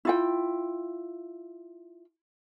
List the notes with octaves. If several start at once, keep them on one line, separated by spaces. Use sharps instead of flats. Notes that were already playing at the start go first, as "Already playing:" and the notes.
E4 F4 G5